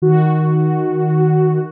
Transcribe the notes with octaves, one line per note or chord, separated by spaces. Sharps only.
D#3 F#4